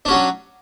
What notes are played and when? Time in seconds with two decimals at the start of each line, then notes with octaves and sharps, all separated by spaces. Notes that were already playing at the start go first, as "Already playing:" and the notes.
0.05 D4
0.08 C#4
0.10 F#4
0.13 F#3